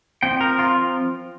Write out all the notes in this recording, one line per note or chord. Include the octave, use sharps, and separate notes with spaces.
F3 C4 G5
A#4
F4